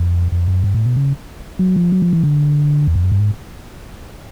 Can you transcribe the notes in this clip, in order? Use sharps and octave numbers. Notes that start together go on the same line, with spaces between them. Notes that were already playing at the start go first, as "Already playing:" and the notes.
Already playing: F2
F2
F#2
G2
A2
B2
C#3
F#3
F3
F#3
F3
E3
D3
E2
F2
F#2
G2
G#2